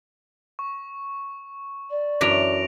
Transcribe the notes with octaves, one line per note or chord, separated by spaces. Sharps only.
C#6
D5
F#2 E3 D4 A#6 D7 F7